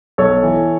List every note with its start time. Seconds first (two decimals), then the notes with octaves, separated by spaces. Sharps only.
0.18 B1 A4 C#5
0.43 E3